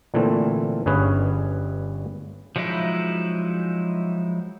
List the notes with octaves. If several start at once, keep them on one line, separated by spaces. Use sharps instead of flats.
A#2 D3 E3 A3 C4
G1 G2 C#4 G#4 B4
F3 F#3 G#3 D#4 E4